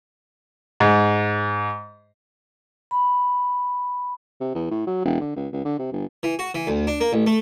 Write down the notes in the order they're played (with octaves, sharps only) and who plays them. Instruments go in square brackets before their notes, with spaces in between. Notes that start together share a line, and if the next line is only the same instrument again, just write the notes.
[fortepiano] G#2
[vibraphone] B5
[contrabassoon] C3
E2
A2
F#3
E1
D3
C#2
C#2
D3
C3
G1
[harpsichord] E3
F#4
E3
D2
D4
A#3
A1
A3